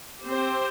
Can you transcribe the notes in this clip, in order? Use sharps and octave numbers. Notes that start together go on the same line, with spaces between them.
C4 G4 C5